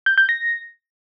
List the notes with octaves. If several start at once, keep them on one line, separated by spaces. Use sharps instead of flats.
G6
G6
A#6